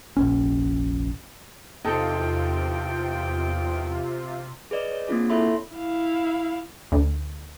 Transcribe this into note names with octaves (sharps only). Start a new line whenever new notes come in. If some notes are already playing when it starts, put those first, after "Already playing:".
F1 A#1 C#4
E2 C3 D#4 F4 A4 G5
G#4 B4 D5 D#5
C#5
A#3 C4 D4 F4 G#4
E4 A4 C#5 E5 B5 C6
E4 F5
D2